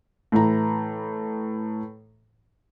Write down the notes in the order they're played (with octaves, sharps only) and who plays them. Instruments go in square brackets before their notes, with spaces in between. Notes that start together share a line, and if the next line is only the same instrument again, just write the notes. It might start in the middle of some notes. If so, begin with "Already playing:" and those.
[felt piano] A2 E3 A#5